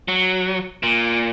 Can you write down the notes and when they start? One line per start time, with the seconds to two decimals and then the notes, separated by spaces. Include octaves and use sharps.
0.08 F#3
0.83 A#2